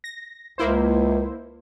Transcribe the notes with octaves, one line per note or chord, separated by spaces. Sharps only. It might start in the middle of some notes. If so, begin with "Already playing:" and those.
A#6
C#2 A#3 E4 C5